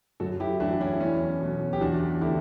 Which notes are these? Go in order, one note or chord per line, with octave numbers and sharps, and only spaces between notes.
F#2 F#4 A4
E4 G4
E3 A3 D4 F#4
C#4 E4
E2 C#4
B2 F#3
G4
E2 D4 F#4
D3 A3 E4 G4